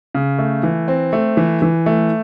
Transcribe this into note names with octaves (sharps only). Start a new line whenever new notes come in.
C#3
A3
E3
C4
A3
E3
E3
A3